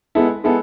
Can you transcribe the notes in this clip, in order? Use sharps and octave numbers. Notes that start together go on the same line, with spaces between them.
G#3 B3 E4 A4
G#3 B3 E4 A4